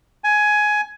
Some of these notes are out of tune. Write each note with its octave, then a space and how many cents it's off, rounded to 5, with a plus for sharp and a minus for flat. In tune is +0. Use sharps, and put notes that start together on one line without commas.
G#5 +15